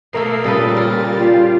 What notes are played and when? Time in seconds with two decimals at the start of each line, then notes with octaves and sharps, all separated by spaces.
0.13 B2 A3 A#3 A4 A#4 C7
0.44 A#2 C#3 G3 A4 B4 A6
0.76 A4 A#4
1.18 F4 G4